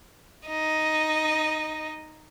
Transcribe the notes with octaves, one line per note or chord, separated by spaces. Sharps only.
D#4 D#5